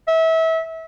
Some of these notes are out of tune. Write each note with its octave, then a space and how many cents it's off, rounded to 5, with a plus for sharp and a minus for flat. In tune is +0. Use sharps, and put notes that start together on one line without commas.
E5 -25